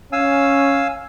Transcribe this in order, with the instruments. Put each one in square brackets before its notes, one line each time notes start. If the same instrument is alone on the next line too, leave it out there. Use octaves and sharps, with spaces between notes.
[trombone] C#4 [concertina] F5 G#5 E6